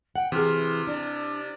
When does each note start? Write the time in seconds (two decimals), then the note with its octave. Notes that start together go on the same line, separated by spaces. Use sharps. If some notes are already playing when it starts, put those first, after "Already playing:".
0.16 F#5 G5
0.32 C3 E3 G#4 C6 F6
0.87 D4 D5